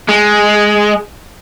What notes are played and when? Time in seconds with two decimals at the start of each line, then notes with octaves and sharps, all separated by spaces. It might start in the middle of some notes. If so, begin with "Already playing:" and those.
0.09 G#3